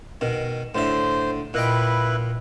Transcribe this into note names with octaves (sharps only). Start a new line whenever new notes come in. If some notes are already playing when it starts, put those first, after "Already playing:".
B2 D#3
A2 D3 C5 E5
A#2 E4 B4 D#5 G5